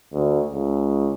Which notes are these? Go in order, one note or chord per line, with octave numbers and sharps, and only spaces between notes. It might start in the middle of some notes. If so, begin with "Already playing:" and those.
D2
C#2